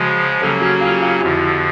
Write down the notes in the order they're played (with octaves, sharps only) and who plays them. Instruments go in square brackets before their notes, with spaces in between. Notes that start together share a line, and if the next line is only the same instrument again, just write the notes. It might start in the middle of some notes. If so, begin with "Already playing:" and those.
Already playing: [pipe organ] C#3 F3 G#3 [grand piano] F#4 G#4
[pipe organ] C#3 F#3 A#3 C#4 [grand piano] G4 A4
[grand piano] F#4 G#4
F4 G4
F4 G4
[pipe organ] F2 D3 F3 [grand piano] E4 F#4